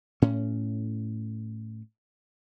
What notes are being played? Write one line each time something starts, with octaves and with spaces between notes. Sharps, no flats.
A2 C#4